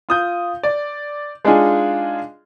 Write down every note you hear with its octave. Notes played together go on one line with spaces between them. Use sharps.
F4 D#6 G6
D5
G#3 D4 D#4 F4 G#4